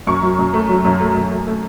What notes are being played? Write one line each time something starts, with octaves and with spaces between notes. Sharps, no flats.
F#2 C#6
F#3
F#2
A3
F#3
F#2
A3
F#2
A3
A3